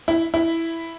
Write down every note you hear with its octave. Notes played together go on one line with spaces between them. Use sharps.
E4
E4